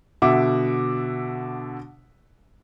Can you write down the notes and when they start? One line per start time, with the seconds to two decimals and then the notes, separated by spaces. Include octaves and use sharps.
0.22 B2 D3 E5 F#5 D6